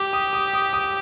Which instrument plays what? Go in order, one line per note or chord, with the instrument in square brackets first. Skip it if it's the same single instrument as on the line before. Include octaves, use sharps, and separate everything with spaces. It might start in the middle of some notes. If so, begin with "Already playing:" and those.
Already playing: [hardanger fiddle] G4 [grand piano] D6
[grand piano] D#6
D#6
D#6
D#6